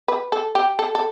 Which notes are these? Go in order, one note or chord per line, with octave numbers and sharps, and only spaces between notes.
B4
A4
G4
A4
A4